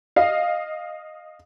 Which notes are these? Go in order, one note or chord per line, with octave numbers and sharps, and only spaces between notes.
D#5 F5